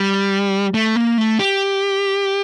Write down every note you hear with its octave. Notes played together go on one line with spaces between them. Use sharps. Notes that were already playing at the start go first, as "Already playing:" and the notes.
Already playing: G3
A3
A#3
A3
G4